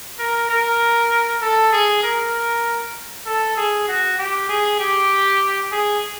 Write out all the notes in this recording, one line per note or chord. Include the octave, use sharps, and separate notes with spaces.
A#4
A#4
A4
G#4
A#4
A4
G#4
F#4
G4
G#4
G4
G#4